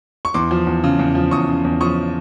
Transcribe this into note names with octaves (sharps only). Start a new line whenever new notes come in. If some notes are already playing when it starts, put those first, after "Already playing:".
C#6
E2 C6 D6
F3
E2
C#3
E2
F3
E2 C#6 D#6
C#3
E2
F3 C#6 D#6